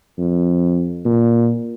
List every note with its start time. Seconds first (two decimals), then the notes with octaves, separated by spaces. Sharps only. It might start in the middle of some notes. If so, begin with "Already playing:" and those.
0.18 F2
1.05 A#2